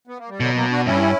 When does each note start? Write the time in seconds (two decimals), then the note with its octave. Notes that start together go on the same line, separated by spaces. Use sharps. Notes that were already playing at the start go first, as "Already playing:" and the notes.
0.07 B3
0.19 A#3
0.29 G3
0.39 B2 D3 F#3
0.55 F#3 A#3
0.71 D4 F#4
0.86 G2 C#4 E4